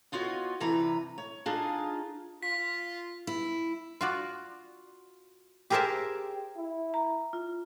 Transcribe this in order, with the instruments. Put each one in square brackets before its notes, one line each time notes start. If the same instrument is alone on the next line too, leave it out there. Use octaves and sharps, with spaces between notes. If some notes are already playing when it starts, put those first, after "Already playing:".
[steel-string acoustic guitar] B3 F4 F#4 C#5 D#5
G2 C3 E3 B4 A#5
C#5
D4 D#4 F4 G#4
[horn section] F4 [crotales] B6
[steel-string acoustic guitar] E4
[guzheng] F4 F#4 D5
G4 G#4 A#4 C5 E5 A5
[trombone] E4
[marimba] A#5
F4